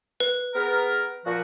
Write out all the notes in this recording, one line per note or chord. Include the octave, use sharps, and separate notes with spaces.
B4
B3 G#4 A#4
A#2 F3 F#4